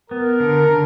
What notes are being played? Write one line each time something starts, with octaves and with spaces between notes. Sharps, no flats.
B3 A#4
D3
D3